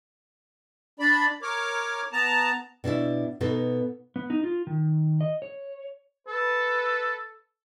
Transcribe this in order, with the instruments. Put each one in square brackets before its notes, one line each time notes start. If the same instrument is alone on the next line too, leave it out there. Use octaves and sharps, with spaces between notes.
[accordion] D4 D5 B5
A#4 C#5 D6
B3 A5 A#5
[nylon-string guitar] B2 D4 E4 E5
B2 B3 D#4 A4
[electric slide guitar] B3
D#4
F4
D#3
D#5
C#5
[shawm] A4 [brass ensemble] B4